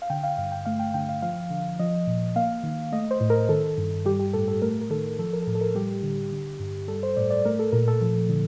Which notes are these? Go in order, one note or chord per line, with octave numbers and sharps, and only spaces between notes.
F5
D3 G5
F5
G2 F5
G5
A3 F5
G5
D3 G5
F5
F3 F5
D3
F3 D#5
A#2
A#3 F5
D#3
A3 D#5
C5
A2
A#4
D#3 A4
G2
G3 G4
G4
A2 A4
A4
A3 A#4
A#4
D#3 A4
F3 A4
A#4
A4
A2 A#4
A4
A#4
G3 G4
D3
D3
G2
G3 A4
C5
A2 D5
D5
A3 A#4
A4
A#2 A#4
A4
F3 A4
D3